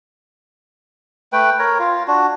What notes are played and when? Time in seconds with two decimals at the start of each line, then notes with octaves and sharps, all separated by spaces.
1.33 A3 B4 G5
1.59 A#4 C#5
1.79 F4
2.08 D4 F#4